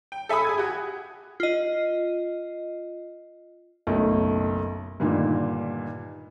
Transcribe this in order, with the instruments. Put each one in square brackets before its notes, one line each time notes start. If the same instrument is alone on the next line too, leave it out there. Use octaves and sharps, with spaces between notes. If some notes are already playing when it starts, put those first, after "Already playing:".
[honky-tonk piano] G5
A4 E5 G#5 B5 D#6
G#4 G#5 G#6
F#4 G4
[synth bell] F4 D#5
[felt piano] F#1 B1 A3
G2 A#2 D3 D#3